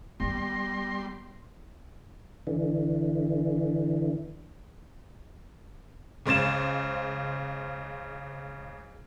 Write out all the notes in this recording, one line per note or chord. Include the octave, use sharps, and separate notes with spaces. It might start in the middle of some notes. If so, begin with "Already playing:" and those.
G3 B3 C6 A#6
D3 E3
C#2 C#3 C5 A6 E7